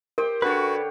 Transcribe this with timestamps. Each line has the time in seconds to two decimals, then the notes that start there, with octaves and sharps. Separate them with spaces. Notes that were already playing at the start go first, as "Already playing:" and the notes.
0.18 G4 A#4 C5 G5
0.42 D3 D4 F#4 B4 C#5